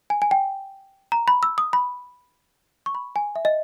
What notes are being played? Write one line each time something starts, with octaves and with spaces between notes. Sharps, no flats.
G#5
G#5
G5
A#5
B5
E6
D#6
B5
C#6
B5
G#5
E5
D#5